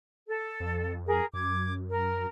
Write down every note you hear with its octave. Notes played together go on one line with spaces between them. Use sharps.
A4
F2
G#4 A#4
F#2 D6 G#6
A#4